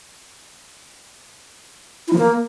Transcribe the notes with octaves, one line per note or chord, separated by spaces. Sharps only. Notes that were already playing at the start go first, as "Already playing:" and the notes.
E4
F3
A#3